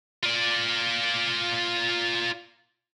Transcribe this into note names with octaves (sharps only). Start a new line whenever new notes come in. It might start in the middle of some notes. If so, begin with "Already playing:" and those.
F4 D5